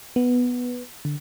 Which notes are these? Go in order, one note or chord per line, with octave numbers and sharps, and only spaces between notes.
B3
D3